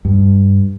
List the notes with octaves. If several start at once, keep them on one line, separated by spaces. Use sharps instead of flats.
G2